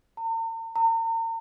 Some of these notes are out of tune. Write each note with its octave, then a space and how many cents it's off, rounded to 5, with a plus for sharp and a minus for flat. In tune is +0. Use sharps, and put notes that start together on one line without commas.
A#5 -45
A#5 -40